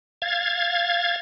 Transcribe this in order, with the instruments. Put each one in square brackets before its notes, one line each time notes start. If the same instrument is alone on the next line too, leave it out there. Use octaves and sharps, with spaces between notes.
[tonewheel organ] F5 G#6 A6